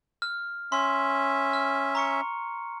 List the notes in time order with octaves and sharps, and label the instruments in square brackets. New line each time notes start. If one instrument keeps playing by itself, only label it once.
[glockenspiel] F6
[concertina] C#4 E5 [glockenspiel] C6
[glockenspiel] F6
A#5 C#6 C#7